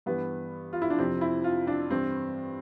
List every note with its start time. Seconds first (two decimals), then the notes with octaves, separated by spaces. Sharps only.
0.06 G2 E3 B3
0.73 F4
0.82 E4
0.90 D4
0.98 F2 C3 F3 C4
1.21 E4
1.44 F4
1.67 D4
1.90 G2 E3 C4